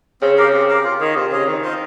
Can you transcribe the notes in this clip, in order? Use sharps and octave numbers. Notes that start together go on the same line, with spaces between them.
C#3 C4
G4 A#4 F5
C4
G4 A#4 F5
F4
D#3 G#4 D#5
C3 F4
C#3 G#4 D#5
D#3 C4
F4 C5 D#5